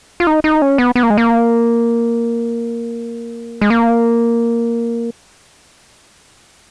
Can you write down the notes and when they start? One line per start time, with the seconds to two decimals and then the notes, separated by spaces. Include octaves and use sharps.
0.20 F4
0.27 D#4
0.44 D#4
0.62 C#4
0.78 B3
0.95 B3
1.03 A#3
1.10 G#3
1.18 A#3
3.61 G#3
3.70 A#3